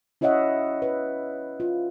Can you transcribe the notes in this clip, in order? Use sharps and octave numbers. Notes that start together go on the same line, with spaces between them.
C#4 E4 C#5 D#5 E5 F#5
B4
F4